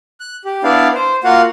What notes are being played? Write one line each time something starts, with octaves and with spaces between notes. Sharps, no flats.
F#6
G4
B3 D4 E4 D5 F5
C5
A#3 F4 F#4 F5 F#5